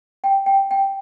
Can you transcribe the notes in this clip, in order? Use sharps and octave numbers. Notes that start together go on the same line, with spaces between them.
G5
G5
G5